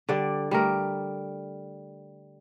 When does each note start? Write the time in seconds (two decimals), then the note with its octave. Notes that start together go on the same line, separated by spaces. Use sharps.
0.09 D3 G3 D5
0.51 G3 A3 A#4